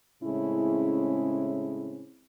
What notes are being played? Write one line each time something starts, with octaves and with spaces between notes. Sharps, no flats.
A2 C#3 G#3 C4 C#4 E4